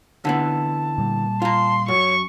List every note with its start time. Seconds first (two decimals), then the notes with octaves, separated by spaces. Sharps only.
0.25 D3 E3 B3 A5
0.98 A#2 G3
1.42 F4 A#5 C6
1.88 F#2 C#5 C#6